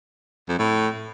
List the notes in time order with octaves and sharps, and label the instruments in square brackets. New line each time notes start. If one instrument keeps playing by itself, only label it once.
[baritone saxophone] F2
A2